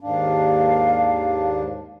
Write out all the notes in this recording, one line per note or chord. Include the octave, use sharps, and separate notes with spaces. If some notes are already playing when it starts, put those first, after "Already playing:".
D#2 G#2 D4 F5